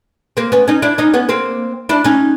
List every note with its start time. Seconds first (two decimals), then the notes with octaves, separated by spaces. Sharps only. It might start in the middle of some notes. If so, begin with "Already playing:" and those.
0.37 A#3 C4
0.52 B3 C#4
0.68 C#4 D#4
0.82 D4 E4
0.98 C#4 D#4
1.14 B3 C#4
1.29 A#3 C4
1.89 D4 E4
2.04 C#4 D#4